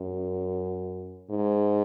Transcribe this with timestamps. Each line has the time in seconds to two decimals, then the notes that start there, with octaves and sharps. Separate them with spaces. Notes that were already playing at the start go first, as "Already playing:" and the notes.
Already playing: F#2
1.30 G#2